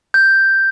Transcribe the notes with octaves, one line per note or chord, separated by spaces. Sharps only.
G6